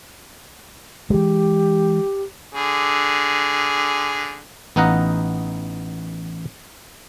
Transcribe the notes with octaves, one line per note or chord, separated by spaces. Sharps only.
E3 G#3 G4
D3 G#4
A1 B3 D#4 F5 F#5 A#5